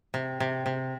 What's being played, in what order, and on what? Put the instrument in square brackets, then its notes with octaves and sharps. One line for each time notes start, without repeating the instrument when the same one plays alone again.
[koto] C3
C3
C3